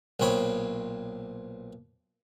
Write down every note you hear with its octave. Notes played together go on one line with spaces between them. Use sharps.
B1 A#2 C4 C#5 B5 D#6